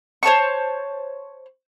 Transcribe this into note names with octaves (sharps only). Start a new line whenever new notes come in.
C5 C#5 A5 C#6